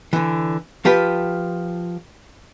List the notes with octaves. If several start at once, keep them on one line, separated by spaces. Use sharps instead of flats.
D3 E3
F3 F4 G4 B4